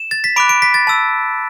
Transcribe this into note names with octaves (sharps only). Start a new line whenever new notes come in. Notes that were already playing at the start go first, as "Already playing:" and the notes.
Already playing: E7
A6
B6
B5 D6 F#6 D7
D7
B6
A6
A5 E6